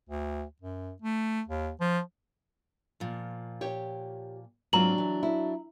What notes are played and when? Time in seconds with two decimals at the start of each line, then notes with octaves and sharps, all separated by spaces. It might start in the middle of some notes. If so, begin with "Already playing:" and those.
0.09 D2
0.62 F#2
1.02 A3
1.48 D#2
1.81 F3
3.00 A#2 F3
3.61 G4 C#5
4.73 G#2 F#3 C4 D4 F4 A#5 F#7
4.98 E3
5.23 E4